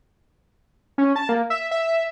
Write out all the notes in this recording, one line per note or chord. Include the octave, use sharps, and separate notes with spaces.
C#4
A5
A#3
E5
E5